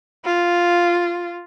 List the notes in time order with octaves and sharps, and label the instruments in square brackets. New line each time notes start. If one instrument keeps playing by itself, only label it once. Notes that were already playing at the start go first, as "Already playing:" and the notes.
[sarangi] F4